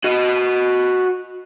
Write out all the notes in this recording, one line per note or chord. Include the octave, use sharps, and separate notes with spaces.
F#4 D#5